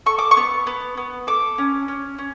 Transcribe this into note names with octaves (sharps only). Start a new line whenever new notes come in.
A4 C#6
D6
C#6
B3
B3
B3
A4 D6
C#4
C#4
C#4